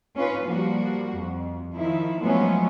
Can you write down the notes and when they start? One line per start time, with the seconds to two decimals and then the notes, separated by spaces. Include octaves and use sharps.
0.16 C#4 D#4 F4 B4
0.46 F3 G3 A#3 F#4
1.12 F2
1.75 D#3 F3 E4
2.21 F3 F#3 G#3 A3 B3 C#4